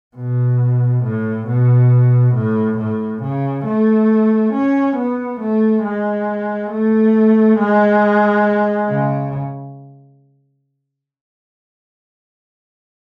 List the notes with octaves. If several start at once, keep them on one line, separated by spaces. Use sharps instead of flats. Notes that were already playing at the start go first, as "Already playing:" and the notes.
B2
A2
B2
A2
A2
C#3
A3
C#4
B3
A3
G#3
A3
G#3
C#3